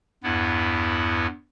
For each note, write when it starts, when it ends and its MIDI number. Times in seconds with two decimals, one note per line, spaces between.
0.23 1.27 40
0.23 1.27 43
0.23 1.27 59
0.23 1.27 64